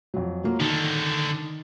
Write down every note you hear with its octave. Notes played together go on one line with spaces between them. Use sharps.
F2 F#3
F#3 A#3 F4
D3 D#3 D#4